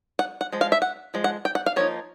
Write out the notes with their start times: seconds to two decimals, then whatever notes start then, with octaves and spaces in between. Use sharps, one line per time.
0.19 F#5
0.41 F#5
0.52 F3 G#3
0.61 F5
0.72 E5
0.82 F#5
1.14 F3 G#3
1.24 F#5
1.45 G5
1.55 F#5
1.66 F5
1.76 F3 A#3 D#4 C#5